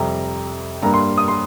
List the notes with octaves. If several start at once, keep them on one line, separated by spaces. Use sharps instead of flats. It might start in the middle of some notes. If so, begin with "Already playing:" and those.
Already playing: F2 C3 G3 C4 A#5
G2 G3 A#3 A#5
C6
D#6
C6